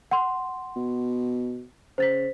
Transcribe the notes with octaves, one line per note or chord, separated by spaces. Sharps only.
F#5 C6
B2
C#3 C5 A6 B6